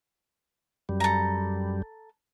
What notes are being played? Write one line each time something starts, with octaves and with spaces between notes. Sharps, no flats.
F#2 G3
A4 A#5